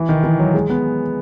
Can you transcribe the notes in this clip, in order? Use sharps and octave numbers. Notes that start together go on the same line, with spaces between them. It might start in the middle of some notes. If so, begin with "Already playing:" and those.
Already playing: E3
D#3
E3
F#3
G#3
B3